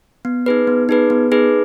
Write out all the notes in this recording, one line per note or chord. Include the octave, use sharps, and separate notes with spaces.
B3
D#4 G#4 B4
B3
D#4 G#4 B4
B3
D#4 G#4 B4